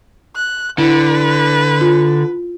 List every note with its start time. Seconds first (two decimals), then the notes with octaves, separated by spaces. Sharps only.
0.36 F#6
0.78 D3 E4 B4
1.81 F4